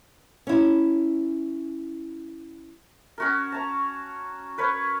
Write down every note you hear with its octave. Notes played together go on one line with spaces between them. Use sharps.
C#4 E4
C#4 F#4 A#4
A5 A#5
A#4 B4 C#5